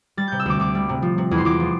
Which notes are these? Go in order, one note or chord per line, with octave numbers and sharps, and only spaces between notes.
G3 A6
C3 G6
E6
D2 D6
D2 D6
G3
C3
F3
C3
E2
C6
E2 D6
F3